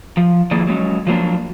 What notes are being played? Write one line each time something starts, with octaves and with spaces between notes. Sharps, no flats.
F3
D#3 F3 A#3 E4 G#4 D5
F#3 G#3 B3 C#4
F3 F#3 A#3 D4